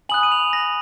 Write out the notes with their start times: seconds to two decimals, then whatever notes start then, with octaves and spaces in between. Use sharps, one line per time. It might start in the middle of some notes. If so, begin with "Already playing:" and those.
0.09 G#5 B5 D#6 F#6 F#7
0.23 D#7
0.32 F7
0.53 A#6